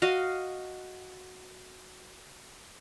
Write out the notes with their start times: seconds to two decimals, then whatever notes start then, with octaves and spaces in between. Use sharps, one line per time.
0.02 F#4 D#5 F5